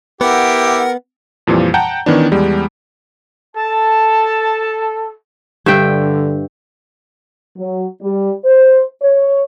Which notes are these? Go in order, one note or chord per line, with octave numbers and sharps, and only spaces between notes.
B3 E4 G4 A#4 F#5
F2 A#2 E3 F3 G3
F#5 G5 A5 A#5 G6
D#3 E3 B3 C#4 D4
E2 G3 G#3
A4 A5
G2 D3 E5 G5
F#3
G3
C5
C#5